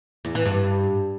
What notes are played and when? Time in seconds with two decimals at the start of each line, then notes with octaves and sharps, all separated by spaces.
0.25 E2
0.35 E3
0.46 G2